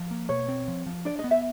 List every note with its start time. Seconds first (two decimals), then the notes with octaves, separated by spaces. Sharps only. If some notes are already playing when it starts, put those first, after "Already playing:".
Already playing: F3
0.11 A#3
0.29 B2 C#5
0.48 C4
0.68 F3
0.87 F3
1.05 D4 D5
1.19 D#5
1.24 B3
1.31 E5